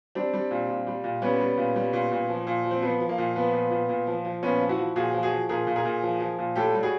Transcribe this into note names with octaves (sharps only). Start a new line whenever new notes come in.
G3 C4 D4
G3
A#2
A#2
G3
A#2
G3 B3 C#4
G3
A#2
G3
A#2
A#2
F3
A#2
F3
C4
F3 B3
F3
A#3
A#2
F3 B3
A#2
A#2
A#2
F3
F3
A#2 B3 C#4
F3
E4 F#4
F3
A#2 F#4 G#4
F3
F#4 G#4
F3
A#2 G#4 A#4
A#2
G#4 A#4
A#2
F3
F3
A#2
A2 G4 A4
G3
F#4 G#4